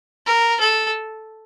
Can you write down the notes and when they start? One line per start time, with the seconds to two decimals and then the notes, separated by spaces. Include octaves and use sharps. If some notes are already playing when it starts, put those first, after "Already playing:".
0.26 A#4
0.60 A4